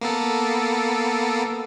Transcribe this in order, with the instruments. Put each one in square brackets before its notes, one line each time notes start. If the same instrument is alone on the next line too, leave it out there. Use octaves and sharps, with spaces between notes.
[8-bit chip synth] A#3 B3 A4